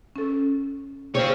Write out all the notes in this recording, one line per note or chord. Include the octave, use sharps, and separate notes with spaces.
C#4 A4
C4 C#5 F5